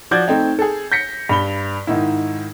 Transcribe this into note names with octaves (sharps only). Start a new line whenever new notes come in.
F3 F#4 D5 G6 G#6
A3 C4 D#4
G#4 A4
G6 A#6 B6 C#7
G2 B5 G7
G#2 D#3 E4